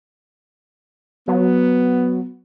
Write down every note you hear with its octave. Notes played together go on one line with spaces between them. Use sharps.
F#3 B3